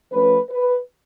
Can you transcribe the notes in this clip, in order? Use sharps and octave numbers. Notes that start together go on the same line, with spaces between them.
F3 A3 C#4 B4
B4